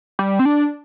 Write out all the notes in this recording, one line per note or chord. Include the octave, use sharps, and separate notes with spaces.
G3
C4
D4